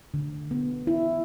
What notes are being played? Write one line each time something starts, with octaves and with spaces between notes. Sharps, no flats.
D3
B3
E4